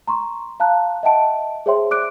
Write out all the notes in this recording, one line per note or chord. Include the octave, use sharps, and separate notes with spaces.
A#5 C6 C#6
F5 A5 A#5 F#6
D#5 E5 F#5 G5 A5 D7
G#4 C5 C#5 E5 G5 C6
D5 D6 F#6 D7